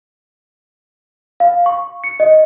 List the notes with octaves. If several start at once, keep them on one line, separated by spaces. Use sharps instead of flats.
F5
C#6
C#7
D#5